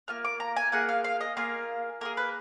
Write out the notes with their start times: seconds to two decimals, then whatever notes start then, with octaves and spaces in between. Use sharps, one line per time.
0.08 A#3 F4 F6
0.25 D6
0.40 A#5
0.56 G#5
0.72 A#3 F4 G#4 F#5
0.89 F5
1.04 F5
1.21 D#5
1.37 A#3 F4 G#4 F5
2.01 A#3 F4 G#4 A#4
2.17 B4